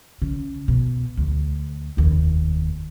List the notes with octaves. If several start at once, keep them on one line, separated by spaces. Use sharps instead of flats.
C#3
B2
D2
F1 D#2